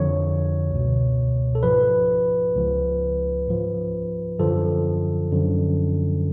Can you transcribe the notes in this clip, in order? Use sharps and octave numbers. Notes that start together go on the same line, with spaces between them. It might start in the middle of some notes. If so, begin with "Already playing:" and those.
Already playing: F2 D3 F3 C#5
C#2 B2
A4
G#2 F3 B4
C#2 C#3 F3
G#2 F3
F#2 D3 F3 A4
F#2 D3 F3